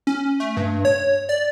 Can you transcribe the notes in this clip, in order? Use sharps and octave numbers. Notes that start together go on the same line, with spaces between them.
C#4
A3
G2
C#5
D5